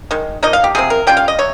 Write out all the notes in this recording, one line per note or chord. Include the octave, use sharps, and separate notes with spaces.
D#3 G#3
F3 A#3 D#4 D#5
F5
G4
C3 F3 C4 G#4
A#4
G3 C#4 F4 G5
F5
D#5
C3 C#5